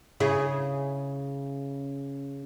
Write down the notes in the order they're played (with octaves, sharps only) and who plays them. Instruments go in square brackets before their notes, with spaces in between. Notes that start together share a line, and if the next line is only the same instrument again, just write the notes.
[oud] C#3 E4 G#4